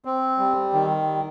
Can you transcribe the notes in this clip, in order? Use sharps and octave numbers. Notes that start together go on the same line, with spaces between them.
C4
G3
D#3